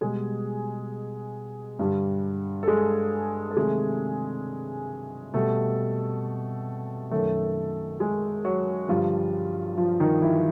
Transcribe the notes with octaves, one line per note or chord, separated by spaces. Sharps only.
B2 G3 G#3 G#4
G2 D3 G3
A4
G#3 G#4
A4
C3 D#3 F#3 G#3 A3 G#4
B2 G3 A3 A4
F#2 D#3 F#3 A3 A4
G#3 G#4
F#3 F#4
G2 D3 F3 G3 F4
F3 F4
D#3 D#4
E3 E4